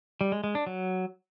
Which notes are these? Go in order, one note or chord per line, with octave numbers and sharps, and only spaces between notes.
G3
G#3
G#3
D4
F#3